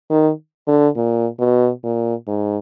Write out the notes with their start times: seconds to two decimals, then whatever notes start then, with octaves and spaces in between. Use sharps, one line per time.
0.10 D#3
0.68 D3
0.96 A#2
1.40 B2
1.84 A#2
2.27 G#2